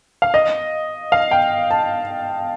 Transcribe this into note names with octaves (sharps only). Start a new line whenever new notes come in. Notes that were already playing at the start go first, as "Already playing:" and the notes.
F5
D#5
F5
G5
A5